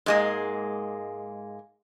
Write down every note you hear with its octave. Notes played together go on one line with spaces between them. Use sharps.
G#2 G#3 A#3